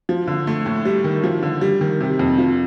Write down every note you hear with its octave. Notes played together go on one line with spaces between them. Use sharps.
F3
D3
A3
A2
G3
D#3
F3
D3
G3
D#3
C3
F2
F3